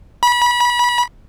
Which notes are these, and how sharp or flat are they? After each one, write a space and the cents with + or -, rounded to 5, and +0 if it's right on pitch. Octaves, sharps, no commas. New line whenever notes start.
B5 -30